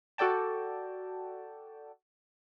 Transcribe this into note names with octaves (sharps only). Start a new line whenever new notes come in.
F#4 A4 D5 G5 A5